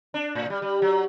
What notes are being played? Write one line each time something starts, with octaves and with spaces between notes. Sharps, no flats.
D4
A2
G3
G3
F#3